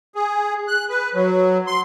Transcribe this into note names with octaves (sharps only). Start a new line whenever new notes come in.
G#4
F#6
B4
F#3
C6